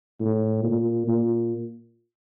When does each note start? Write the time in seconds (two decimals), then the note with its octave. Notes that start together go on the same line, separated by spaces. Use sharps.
0.20 A2
0.64 A#2
1.08 A#2